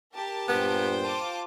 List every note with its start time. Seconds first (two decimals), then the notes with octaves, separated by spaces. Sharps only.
0.14 G4 A#4 A5
0.48 G2 A#2 B3 C5 G5
1.03 F4 A5 D6